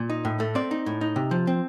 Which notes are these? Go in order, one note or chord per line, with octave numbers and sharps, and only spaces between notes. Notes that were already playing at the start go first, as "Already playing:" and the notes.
Already playing: A#2
D#4
A2
A3
C4 D5
D#4
A2
D#4
C3
F3
C4